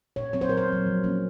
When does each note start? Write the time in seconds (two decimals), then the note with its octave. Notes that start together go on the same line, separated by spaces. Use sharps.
0.16 A#2 C#5
0.33 F#3 C4 C#5
0.41 C5
0.49 A#2 A#4
0.57 C5
0.68 F#3 C4
0.86 F3
1.04 A#3 C#4